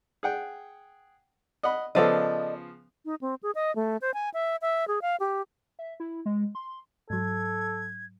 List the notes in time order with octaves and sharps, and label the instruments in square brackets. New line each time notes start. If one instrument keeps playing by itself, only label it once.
[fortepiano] G#4 F#5 G5
D#5 F#5 B5
[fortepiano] C#3 F3 B3 [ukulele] A4 D5 D#5
[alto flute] D#4
C4
G#4
D#5
A3
C5
G#5
E5
E5
G#4
F5
G4
[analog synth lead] E5
E4
G#3
C6
[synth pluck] G#2 F#3 [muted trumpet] A4 [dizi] G#6